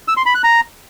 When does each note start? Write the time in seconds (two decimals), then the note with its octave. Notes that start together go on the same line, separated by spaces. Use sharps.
0.08 E6
0.17 C6
0.26 B5
0.35 F#6
0.44 A#5